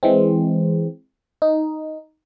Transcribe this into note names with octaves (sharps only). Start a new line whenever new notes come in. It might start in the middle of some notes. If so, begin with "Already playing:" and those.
E3 G#3 C4
D#4